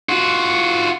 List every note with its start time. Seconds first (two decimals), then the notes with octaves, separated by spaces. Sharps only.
0.09 F4 F#4